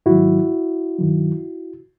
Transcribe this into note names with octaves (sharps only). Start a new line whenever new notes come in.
G#2 D#3 F#3 E4 F#4
G2 D#3 F#3